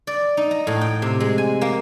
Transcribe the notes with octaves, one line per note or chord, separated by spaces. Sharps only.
D5
D#4
A#5
A2
G5
C3
G#3
G#5
A#3